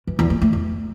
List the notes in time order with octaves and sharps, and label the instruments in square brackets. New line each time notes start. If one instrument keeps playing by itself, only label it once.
[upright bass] E3
E2
A#3
A3
E2